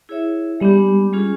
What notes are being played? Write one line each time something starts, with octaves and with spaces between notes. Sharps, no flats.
E4 G#4 C#5 E5
G3 G#3 B3 D4 G4
G#3 C#4 F4 G#4